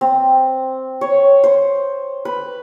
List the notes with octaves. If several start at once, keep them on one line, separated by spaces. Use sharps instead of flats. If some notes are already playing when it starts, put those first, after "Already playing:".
C4
C#5
C5
B4